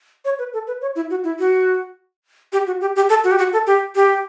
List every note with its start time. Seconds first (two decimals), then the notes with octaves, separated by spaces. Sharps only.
0.25 C#5
0.39 B4
0.53 A4
0.67 B4
0.81 C#5
0.96 E4
1.10 F#4
1.24 E4
1.39 F#4
2.53 G4
2.67 F#4
2.81 G4
2.96 G4
3.09 A4
3.24 F#4
3.31 G4
3.38 F#4
3.53 A4
3.67 G4
3.95 G4